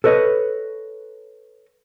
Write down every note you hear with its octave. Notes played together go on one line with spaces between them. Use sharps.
A4 B4 C#5 D#5